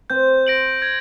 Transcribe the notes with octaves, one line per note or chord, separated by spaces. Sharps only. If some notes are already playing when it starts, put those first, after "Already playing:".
C4 G6
A#6 D7 F#7
G#6